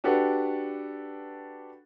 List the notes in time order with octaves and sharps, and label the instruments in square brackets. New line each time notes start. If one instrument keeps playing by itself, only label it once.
[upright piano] D4 F#4 G4 A4 B4 D5